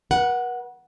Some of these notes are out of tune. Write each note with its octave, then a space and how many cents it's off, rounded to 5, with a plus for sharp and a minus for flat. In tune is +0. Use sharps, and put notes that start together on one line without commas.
B4 -45 F#5 +0